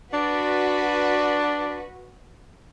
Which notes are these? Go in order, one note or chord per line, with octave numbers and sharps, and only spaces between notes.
D4 F#4 B4 D5